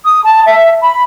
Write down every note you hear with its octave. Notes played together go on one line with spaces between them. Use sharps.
D#6
A5
E5
B5